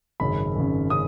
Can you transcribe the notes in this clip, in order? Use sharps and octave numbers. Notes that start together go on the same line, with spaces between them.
G#1 F#2 C#3 B5
G#1 F#2 C#3
C#3 D#6